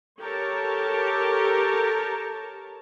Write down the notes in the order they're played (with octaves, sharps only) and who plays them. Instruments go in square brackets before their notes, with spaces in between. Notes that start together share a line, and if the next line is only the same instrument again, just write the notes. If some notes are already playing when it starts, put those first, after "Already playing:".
[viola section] G4 A4 A#4 C#5 A5